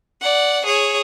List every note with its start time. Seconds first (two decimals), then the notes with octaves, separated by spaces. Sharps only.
0.21 D5 F#5
0.66 G#4 C#5